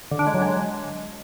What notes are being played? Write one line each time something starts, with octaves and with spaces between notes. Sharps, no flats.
D3
D4
G#3
F#3
G#3